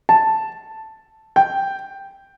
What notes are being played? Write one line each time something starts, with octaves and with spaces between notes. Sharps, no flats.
A5
G5